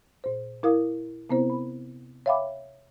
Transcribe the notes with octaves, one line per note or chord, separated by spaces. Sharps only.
A#2 C5
E4 A#4 F5 D#6
C3 B3 C4 E4 C5
B5
C#5 E5 F5 G5 B5 D6